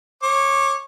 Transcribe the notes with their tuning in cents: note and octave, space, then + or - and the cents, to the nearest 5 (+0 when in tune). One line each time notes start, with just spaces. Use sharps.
C#5 -20 D6 +0